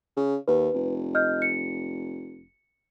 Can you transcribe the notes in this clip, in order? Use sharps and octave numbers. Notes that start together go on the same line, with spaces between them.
C#3
D#2 B4
F1
D#5 F6 G6
C#7